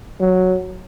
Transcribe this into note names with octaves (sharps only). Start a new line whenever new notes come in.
F#3